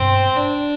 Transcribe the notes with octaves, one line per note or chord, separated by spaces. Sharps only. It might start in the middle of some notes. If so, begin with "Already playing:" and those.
Already playing: G2 B2 C4
D4